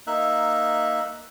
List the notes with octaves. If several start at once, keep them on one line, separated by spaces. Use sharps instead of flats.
A#3 D#4 E5 F#6